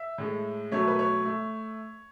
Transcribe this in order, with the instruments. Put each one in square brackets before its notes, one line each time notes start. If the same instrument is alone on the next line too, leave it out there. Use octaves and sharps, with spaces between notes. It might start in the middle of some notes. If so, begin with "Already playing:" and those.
Already playing: [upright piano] E5
A2 G#3
B2 F#3 A3 C#5
B4
C#5
A3